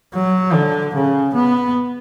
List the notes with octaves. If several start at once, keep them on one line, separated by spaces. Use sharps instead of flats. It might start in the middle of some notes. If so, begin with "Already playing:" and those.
F#3
D3
C#3
B3